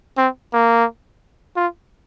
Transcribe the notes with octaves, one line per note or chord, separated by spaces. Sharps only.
C4
A#3
F4